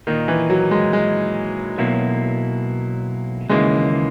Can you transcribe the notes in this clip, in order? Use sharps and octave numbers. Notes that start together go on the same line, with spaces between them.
A#2 D#3 A#3 D#4
E3
F#3
G#3
G#3
B1 B2 F#3 A#3 E4
D#2 C#3 E3 G#3 A#3